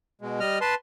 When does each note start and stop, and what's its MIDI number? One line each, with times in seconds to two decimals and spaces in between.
0.21 0.40 47
0.21 0.40 56
0.40 0.58 55
0.40 0.58 75
0.40 0.58 89
0.61 0.75 71
0.61 0.75 81
0.61 0.75 84